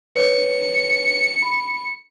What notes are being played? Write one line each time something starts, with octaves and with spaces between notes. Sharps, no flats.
B4 C#5 C#7
B5